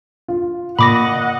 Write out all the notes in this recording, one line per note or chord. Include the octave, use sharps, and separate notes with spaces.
F4
A#2 D#5 F#5 B5 D6 A#6